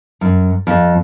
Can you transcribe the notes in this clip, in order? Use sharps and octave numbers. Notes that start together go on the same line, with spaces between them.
F#2
F2